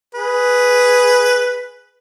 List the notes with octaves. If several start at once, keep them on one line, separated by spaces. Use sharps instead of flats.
G#4 B4